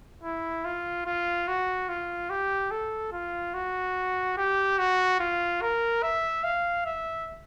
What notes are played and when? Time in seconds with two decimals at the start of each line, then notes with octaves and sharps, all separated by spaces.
0.24 E4
0.65 F4
1.06 F4
1.48 F#4
1.89 F4
2.30 G4
2.71 A4
3.12 F4
3.54 F#4
4.37 G4
4.78 F#4
5.19 F4
5.62 A#4
6.03 E5
6.44 F5
6.85 E5